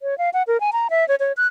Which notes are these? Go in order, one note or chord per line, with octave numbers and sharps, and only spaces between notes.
C#5
F5
F#5
A#4
G#5
A#5
E5
C#5
C#5
F#6